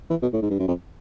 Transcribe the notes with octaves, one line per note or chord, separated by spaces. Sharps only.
E3
B2
A2
G#2
G2
F#2
F2